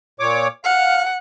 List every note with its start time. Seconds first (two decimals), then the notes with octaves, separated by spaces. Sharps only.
0.20 A#2 C#5 D6
0.64 F5 F#5